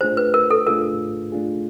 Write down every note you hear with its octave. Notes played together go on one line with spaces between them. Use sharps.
A3 D4 F4 G#4 C5
B4
A#4
A4
A3 D4 F4 G#4 A#4
A3 D4 F4 G#4